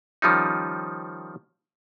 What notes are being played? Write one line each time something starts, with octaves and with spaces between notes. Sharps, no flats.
D#3 F3 G3 C#4 D#4